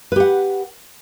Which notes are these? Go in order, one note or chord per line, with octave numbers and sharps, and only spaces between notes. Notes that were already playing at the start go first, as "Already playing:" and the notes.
G4 B4 F#5